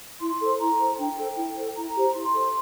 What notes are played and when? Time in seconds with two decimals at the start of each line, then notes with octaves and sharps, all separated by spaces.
0.21 E4 C6
0.40 A4 C5
0.59 E4 A#5
0.79 A4 C5
0.98 D4 G5
1.18 A4 C5
1.37 E4
1.56 A4 C5
1.75 E4 A#5
1.96 G4 C5
2.14 E4 C6
2.34 A4 C5